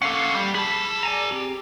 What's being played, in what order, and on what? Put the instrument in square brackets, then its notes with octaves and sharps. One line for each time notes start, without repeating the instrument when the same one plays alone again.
[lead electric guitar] A#3 C#4 [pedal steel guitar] A4 F5 F#5
[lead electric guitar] G3
[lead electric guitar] G#4 A5 [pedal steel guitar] B5
[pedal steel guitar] D5 G#5 A#5
C4 G4